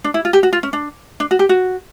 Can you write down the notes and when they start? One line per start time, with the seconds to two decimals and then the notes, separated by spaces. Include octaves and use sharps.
0.04 D4
0.14 E4
0.25 F4
0.33 G4
0.43 F#4
0.53 F4
0.63 C#4
0.73 D4
1.20 D4
1.31 F#4
1.39 G4
1.49 F#4